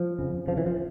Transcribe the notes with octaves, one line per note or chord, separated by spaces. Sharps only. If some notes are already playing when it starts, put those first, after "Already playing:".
Already playing: F3
F2 C#3
F2 C#3 F3
E3
F3